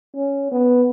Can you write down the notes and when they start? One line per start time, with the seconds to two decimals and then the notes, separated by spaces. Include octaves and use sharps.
0.16 C#4
0.52 B3